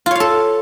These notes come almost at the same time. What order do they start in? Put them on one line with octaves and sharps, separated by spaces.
F4 C#5 F5 A4